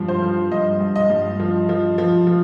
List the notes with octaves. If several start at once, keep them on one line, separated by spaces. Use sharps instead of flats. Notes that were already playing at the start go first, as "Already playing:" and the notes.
Already playing: G2 F3
C5
F3
G2 D#5
G2
D#5
G2
F3
F3
F3
F3